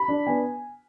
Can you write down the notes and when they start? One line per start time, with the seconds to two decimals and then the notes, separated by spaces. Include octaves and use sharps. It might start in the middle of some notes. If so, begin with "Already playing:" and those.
Already playing: B5
0.08 D4
0.27 B3 G#5